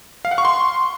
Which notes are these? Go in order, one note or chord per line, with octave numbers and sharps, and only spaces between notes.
F5
F#5
C#6
C6